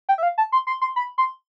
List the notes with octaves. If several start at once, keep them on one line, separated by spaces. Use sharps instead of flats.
G5
E5
F5
A5
C6
C6
C6
B5
C6